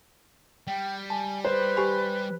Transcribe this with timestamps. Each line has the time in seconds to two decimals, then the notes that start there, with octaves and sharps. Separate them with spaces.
0.67 G3 G5
1.10 G#5 A5
1.45 B4 C5
1.77 G4 G#5 B5